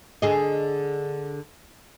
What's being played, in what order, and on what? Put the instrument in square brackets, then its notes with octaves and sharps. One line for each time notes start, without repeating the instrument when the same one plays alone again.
[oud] D3 G#4 D#5